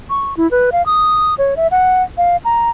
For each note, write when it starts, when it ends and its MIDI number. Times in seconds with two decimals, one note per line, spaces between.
0.10 0.37 85
0.37 0.50 64
0.51 0.70 71
0.72 0.85 77
0.86 1.35 87
1.38 1.55 73
1.57 1.67 76
1.71 2.03 78
2.18 2.37 77
2.45 2.70 82